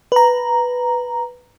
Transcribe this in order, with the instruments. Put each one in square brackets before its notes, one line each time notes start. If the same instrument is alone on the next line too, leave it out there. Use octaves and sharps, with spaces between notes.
[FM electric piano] B4 A#5